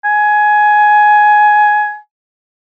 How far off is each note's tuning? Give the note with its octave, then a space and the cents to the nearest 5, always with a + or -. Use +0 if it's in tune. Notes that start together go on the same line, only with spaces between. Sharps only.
G#5 +15